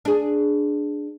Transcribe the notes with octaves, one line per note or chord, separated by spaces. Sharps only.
D4 G#4